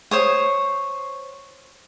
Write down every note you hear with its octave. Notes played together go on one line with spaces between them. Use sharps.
C5 C#5 D#6